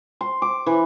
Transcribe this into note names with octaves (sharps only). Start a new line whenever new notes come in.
C6
D6
E3